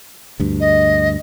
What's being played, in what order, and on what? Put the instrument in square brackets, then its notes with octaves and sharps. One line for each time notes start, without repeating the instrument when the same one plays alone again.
[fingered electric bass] D2 G2
[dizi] D#5